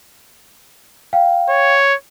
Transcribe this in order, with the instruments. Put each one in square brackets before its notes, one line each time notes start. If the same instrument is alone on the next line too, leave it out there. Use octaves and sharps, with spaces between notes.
[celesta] F5 G5
[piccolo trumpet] C#5